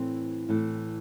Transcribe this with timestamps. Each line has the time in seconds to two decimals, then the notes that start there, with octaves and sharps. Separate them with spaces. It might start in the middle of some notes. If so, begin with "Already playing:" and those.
Already playing: A2 E3 C4
0.49 A2 E3